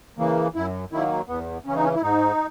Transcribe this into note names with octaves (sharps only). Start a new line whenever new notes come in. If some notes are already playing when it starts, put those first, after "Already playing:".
C#3 E3 A#3
F#2 E4
D#3 F#3 A#3 E4
E2 B3
C#3 E3 C#4
D#4
C#4
E4
G#2 D#4